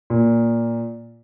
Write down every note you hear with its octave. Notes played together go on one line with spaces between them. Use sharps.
A#2